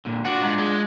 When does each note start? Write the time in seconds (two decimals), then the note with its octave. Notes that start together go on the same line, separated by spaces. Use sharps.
0.05 A#2 D3
0.25 D4 F4 F#4 D5
0.42 G#2
0.59 G#3